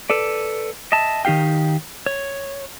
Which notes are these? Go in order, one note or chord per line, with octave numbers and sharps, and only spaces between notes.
A4 B4 D5
D#5 E5 A5
D#3 D#4 G4 F5 G5
C#5